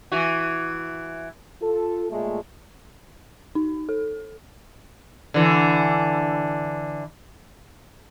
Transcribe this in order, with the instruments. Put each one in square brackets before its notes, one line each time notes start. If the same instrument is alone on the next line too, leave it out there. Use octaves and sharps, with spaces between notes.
[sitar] E3 F#4
[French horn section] F4 A4
A#2 G#3 A3
[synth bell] D#4
A4
[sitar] D3 E3